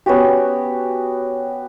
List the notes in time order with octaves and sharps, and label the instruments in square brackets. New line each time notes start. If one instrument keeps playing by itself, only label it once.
[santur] B3 C#4 F#4 G4